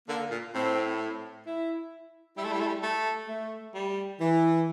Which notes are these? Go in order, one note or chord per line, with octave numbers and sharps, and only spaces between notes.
D3 A#3
A#2
A2 C4
E4
G3 E4
A3
G3
A3
G3
A3
A3
G3
E3